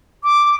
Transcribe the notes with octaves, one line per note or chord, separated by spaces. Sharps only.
D6